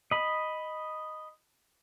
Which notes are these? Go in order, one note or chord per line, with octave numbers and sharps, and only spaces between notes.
D#5 B5